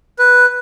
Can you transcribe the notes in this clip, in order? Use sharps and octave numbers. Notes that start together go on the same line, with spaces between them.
B4